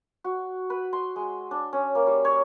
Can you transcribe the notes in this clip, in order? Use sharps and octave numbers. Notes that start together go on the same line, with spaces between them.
F#4
B4
C6
G#3
D4
C#4
A#3
G3
C#5